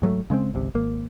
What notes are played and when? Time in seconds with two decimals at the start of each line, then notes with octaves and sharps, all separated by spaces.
0.02 G#2 F#3 G#3 A3
0.30 C#3 G#3 A3 C4
0.54 G#1 C#2 C3
0.75 G#1 A#3